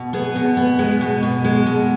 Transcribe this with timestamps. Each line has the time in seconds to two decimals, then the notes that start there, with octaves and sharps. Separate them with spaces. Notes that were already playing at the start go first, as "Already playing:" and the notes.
Already playing: B2
0.13 B3 G#4
0.35 B2
0.57 B3
0.79 G#3
1.01 B2
1.23 B2
1.45 G#3
1.67 B2